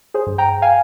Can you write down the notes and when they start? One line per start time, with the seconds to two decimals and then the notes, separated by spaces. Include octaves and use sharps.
0.14 G#4 C5
0.26 G2
0.38 G5 A#5
0.62 F5 G#5